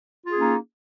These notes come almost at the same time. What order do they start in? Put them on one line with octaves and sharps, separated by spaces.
F4 G#4 C#4 A#3 D#4